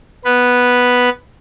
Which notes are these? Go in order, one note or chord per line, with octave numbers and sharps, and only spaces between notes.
B3 B4